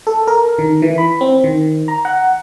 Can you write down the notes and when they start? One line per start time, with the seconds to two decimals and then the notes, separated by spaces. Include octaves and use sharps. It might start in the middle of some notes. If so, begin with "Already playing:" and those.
0.07 A4
0.27 A#4
0.59 D#3
0.82 E3
0.98 B5
1.21 C4
1.44 D#3
1.88 A#5
2.05 F#5